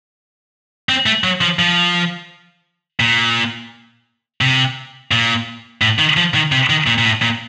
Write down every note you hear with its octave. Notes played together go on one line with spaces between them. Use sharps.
C4
A3
F#3
F3
F3
A#2
C3
A#2
A2
D#3
F3
D#3
C3
D#3
A#2
A#2
A2
A#2